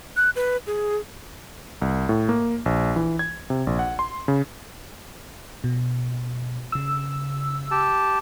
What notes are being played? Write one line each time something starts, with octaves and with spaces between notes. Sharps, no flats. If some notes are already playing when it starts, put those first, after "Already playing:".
F#6
B4
G#4
C2
A2
A#3
A#1
E3
G#6
C3
A#1
F#5
C6
C#3
B2
C#3 E6
G4 A5